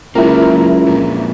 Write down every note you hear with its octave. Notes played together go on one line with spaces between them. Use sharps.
C#2 F#3 A#3 E4 A#4
F2 A#2